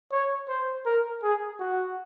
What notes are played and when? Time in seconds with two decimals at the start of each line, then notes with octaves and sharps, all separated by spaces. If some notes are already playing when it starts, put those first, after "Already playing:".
0.12 C#5
0.49 C5
0.86 A#4
1.23 G#4
1.60 F#4